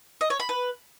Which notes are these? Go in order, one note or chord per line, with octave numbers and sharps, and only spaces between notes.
D#5
C#5
B5
B4